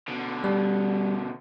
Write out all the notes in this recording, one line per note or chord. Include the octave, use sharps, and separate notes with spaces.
B2 D3
G3